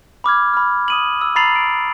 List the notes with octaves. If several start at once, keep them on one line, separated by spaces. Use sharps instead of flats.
B5 D6 F6 G#6
B5 F6
D#6 D#7 F#7
E6
A#5 B5 A6 C7 F7 F#7
D7